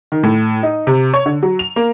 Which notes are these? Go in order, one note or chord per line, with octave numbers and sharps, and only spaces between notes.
D#3
A2
D#4
C3
C#5
D3
F#3
F7
A#3